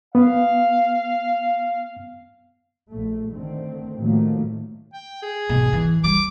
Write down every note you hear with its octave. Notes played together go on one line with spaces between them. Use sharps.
B3 F5
A#1 A3
D3 D#3 A3 C4
A2 D#3 F3 F#3 A3 A#3
G5
G#4
G#1 B2
E3
G3 D6